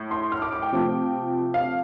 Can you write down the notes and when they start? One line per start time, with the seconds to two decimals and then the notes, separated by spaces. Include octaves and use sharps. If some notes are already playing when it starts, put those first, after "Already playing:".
Already playing: A2
0.11 C6
0.32 F6
0.42 D6
0.53 D6
0.62 G5
0.72 C3 F3 A3
1.54 F5